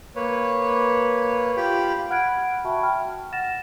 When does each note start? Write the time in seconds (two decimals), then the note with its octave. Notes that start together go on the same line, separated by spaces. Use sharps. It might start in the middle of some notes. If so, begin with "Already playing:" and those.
0.16 A#3 B4 C#5
1.57 F4 G4 G5 B5
2.10 F#5 B5 F6 F#6 G#6 D7
2.64 F#4 E5 G5 A5 B5 C#6
2.83 G5 F6
3.32 F#5 F6 A6 A#6 E7